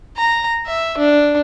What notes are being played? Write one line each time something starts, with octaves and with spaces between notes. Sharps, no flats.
A#5
E5
D4